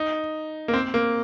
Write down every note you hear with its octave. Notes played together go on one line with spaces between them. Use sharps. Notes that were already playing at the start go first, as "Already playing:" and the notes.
Already playing: D#4
A#3
C4
A#3